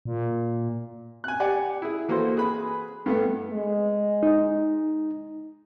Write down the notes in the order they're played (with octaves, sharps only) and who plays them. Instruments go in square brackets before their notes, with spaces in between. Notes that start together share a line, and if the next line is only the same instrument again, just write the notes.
[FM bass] A#2
[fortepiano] G#5 F#6
G4 D5 F#5 G#5
E4 G#4
E3 A#3 F#4 A4 C5
G#4 B4 B5
G2 A3 B3
[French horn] G#3
[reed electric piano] D#4